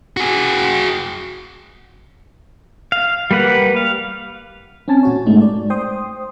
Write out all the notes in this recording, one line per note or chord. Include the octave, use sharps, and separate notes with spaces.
F#4 G#4
F5
G3 A#3 B4 F#5
F5
C4 C#4 G#5 A5
A#2 F#4 C#5
G#2 G#3 A3 D#4
D5
C5 G5 C6 D#6